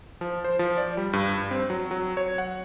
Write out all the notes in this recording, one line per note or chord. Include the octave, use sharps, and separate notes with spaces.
F3
C5
F3
D5
G3
G2
G2
C4
F#3
F#3
C#5
F#5